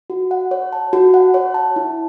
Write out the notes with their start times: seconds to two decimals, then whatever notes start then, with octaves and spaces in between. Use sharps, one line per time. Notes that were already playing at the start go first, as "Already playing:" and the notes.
0.10 F#4
0.31 F#5
0.51 C#5
0.73 A5
0.93 F#4
1.14 F#5
1.34 C#5
1.54 A5
1.76 E4